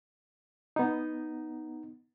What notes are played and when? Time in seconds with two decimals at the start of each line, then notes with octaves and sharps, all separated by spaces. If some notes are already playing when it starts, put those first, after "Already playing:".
0.76 B3 D#4